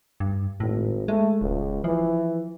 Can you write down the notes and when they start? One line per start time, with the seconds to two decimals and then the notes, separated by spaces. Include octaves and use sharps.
0.20 G2
0.60 G#1 A2
1.08 G#3 A3
1.41 D#1 C#2
1.84 E3 F3